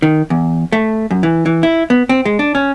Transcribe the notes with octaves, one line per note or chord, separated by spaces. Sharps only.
D#3
E2
A3
F#2
E3
E3
E4
B3
C4
G#3
D4
C#4